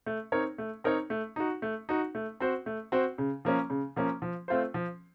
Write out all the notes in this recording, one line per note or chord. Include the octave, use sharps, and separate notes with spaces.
A3
C4 D#4 A#4 C#5
A3
C4 D#4 A#4 C#5
A3
D#4 F#4
A3
D#4 F#4
A3
C4 F#4 C5
A3
C4 F#4 C5
C#3
F3 A#3 C#4
C#3
F3 A#3 C#4
F3
A3 C4 F4 C5
F3